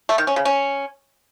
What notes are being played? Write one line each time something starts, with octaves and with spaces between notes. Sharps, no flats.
A3
D#3
C#4
C#3
C#4